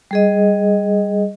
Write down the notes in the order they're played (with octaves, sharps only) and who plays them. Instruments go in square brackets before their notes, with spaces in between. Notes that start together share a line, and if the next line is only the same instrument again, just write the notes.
[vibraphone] G3 G#4 D#5